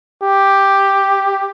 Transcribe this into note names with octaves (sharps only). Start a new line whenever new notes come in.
G4